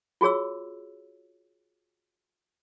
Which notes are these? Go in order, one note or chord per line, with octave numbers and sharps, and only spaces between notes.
F4 F#4 G#4 C#5 E6